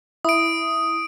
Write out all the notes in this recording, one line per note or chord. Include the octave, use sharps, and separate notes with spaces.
E4 D#6 D7